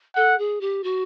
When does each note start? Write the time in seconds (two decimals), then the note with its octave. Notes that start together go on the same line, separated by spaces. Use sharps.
0.16 A4 F#5
0.38 G#4
0.61 G4
0.84 F#4